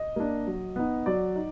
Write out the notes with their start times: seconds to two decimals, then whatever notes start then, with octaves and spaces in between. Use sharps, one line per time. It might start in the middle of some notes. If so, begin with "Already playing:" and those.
Already playing: D#5
0.16 A#3 D4
0.47 F#3
0.76 B3 D#4
1.06 F#3 D5
1.36 D#4